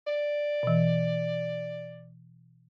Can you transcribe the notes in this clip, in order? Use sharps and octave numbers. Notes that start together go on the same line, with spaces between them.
D5
B2 E3